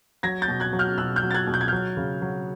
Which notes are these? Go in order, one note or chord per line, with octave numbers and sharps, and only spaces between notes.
F#3 G#6 A#6
G6 A6
B2
F#6 G#6
F#3
F6 G6
B2 E6 F#6
F6 G6
F#3
A6
F#6 G#6
B2
G6
G#6
F#3 F6 G6
C#3
F#3